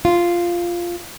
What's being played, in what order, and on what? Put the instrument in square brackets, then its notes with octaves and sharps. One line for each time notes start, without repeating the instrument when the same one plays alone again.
[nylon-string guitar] F4